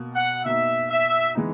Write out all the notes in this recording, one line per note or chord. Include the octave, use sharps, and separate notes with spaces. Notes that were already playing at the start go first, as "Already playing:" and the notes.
Already playing: B2 A#3
F#5
B2 A#3 D#4 E5
E5
E3 G#3 B3 D#4